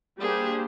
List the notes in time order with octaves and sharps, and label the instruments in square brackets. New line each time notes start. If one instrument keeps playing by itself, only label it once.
[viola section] G3 A#3 D4 G4 C5 [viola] G#4